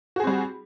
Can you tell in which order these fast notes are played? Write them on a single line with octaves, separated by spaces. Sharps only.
F#4 G#4 C4 G3